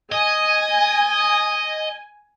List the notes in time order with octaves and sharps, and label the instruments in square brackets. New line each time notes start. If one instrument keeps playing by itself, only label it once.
[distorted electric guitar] D#5 [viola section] G#5